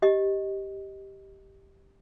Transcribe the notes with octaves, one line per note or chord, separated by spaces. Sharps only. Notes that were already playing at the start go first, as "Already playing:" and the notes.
G4 D#5